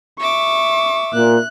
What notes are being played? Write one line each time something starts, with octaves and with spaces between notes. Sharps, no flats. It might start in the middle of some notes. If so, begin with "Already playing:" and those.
E5 C#6 D6
A#2 F#6